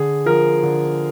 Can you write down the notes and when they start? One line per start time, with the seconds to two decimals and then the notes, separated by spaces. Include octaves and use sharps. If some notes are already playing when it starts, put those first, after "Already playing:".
Already playing: D3 G#4
0.26 F3 A#4
0.63 D3